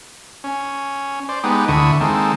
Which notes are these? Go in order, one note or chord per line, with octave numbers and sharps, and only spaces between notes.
C#4
C5 D5
G#3 B3 D#4 G4
D2 D3 E4 C#6 D#6
D#3 G#3 A#3 C4 A4